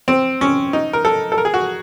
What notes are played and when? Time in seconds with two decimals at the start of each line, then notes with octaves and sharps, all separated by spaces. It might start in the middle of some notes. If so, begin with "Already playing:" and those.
0.08 C4
0.41 C#4
0.73 D#4
0.93 A#4
1.05 A4
1.32 A4
1.38 A#4
1.45 G#4
1.54 F#4